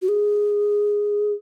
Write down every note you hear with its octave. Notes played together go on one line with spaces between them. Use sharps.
F#4
G#4